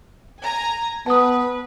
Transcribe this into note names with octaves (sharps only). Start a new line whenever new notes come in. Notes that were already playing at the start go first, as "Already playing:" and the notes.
G#5 A#5
B3 B4 A5 D#6